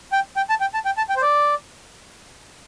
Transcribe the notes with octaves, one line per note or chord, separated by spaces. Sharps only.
G5
G5
A5
G5
A5
G5
A5
G5
C5
D5